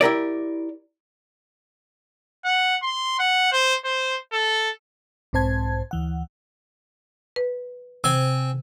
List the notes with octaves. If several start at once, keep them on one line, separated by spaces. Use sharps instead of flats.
E4 G4 A#4 D5
F#5
C6
F#5
C5
C5
A4
B1 G#2 C4 C5 A5 G#6
D2 E3 F#5
B4
C3 C4 G#5